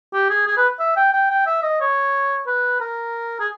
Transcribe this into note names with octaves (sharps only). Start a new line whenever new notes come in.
G4
G#4
G#4
B4
E5
G5
G5
G5
E5
D#5
C#5
B4
A#4
G#4